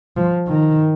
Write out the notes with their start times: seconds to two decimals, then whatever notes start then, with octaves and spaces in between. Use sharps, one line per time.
0.17 F3
0.48 D#3